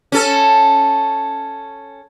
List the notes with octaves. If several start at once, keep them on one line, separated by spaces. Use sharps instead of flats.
C#4 A4